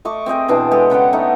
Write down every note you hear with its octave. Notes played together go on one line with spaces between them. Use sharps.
A3 D#5 C#6 D6
C4 G#4 D#5 G5
B2 E3 D4 C6
G#3 G4 A4 D#5
C#3 B3 F#5 G5
A3 D#4